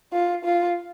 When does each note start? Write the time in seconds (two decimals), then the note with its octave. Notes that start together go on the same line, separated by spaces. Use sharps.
0.13 F4
0.44 F4